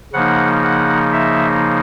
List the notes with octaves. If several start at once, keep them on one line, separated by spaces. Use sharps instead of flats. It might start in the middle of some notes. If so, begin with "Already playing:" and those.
C#3 F3 A#3 D#4 F#5
F#5
E5